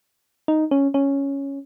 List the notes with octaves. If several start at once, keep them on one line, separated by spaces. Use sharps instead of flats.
D#4
C#4
C#4